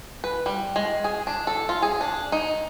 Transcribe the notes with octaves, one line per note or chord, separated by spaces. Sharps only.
B4
G3
G#3
G#4
D4
A4
F4
G#4
D4
D#4